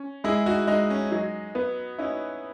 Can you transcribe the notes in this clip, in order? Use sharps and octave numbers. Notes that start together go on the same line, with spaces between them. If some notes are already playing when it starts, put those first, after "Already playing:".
Already playing: C#4
G#3 E4 G#4
D#4 F#4
G#3 D#4
C#4
F#3 D#4
B3
C#4 D#4 E4